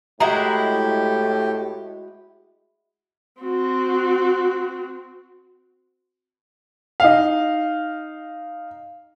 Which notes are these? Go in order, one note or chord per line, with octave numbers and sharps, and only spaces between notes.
A2 G#3 E4 F#4 G4 A#5
C4 F#4
D#4 F5